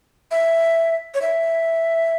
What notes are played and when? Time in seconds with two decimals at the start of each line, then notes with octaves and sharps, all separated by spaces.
0.31 E5
1.14 C#5
1.22 E5